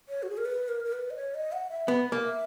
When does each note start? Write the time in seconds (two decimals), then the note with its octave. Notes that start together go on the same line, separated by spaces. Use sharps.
0.09 C#5
0.23 F#4
0.30 G#4
0.37 A#4
0.45 B4
0.68 A#4
0.85 A#4
0.92 B4
1.10 D#5
1.16 C#5
1.34 D#5
1.52 F#5
1.70 E5
1.88 B3
2.12 A#3
2.24 E5